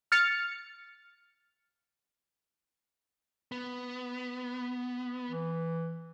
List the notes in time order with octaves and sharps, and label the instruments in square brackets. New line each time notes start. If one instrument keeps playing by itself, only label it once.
[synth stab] F6 A6 C#7
[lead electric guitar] B3
[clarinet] E3